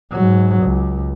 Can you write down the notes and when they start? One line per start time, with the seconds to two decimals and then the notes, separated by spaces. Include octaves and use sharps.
0.12 G#2 F#3
0.63 C#2